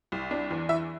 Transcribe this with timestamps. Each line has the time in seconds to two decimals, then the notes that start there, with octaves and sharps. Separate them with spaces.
0.12 C2
0.31 D4
0.51 E2
0.69 E3 E5